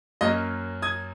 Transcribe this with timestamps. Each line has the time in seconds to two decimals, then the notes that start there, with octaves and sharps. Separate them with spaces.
0.21 F#2 F#3 A#3 C#4 D#5
0.82 D#6 G#6